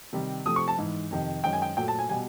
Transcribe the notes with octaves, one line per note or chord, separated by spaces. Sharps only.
C3 D#3 G3
C3 F3 A3 D#6
C#6
A5
G#2 E3 G#3
F2 C3 D#3
F#2 D#3 G#3 G5
G#5
G5
A#2 F#3 A3 G5
A5
G#5
B2 G3 G#5